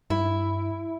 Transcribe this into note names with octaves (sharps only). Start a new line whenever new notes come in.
G2 E4